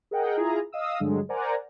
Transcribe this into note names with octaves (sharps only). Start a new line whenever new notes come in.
G#4 A#4 D#5 F#5 G5
E4 F4 G#4 A#5
D#5 F5 D#6 E6
G2 D3 F#3 G#3
A#4 C5 D5 F#5 G#5 A#5